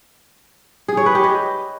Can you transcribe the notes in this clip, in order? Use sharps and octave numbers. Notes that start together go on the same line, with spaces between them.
G#4
C#5
B4
G4
D#5